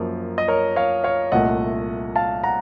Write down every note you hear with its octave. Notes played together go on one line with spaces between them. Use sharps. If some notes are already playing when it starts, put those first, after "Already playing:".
Already playing: F#2 F3 A#3
D#5
A#4 C#5
C#5 F5
C#5 F5
C2 A#2 A3 D#5 F#5
F5 A5
F#5 A#5